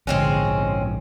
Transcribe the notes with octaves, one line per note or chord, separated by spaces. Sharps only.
A#1 G#2 D3 G#3 C4 C#4